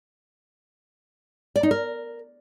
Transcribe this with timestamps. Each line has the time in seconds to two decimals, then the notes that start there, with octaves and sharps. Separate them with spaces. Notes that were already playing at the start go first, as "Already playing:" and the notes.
1.56 D5
1.63 D#4
1.71 A#4